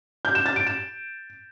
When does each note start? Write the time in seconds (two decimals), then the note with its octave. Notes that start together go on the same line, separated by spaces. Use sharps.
0.25 G6
0.35 E7
0.46 A6
0.56 D7
0.67 E7